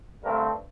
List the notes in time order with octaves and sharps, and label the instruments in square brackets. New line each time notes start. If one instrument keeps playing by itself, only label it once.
[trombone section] G2 D3 A3 C4 A#4